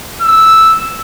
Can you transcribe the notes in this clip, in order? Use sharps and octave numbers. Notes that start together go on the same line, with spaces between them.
E6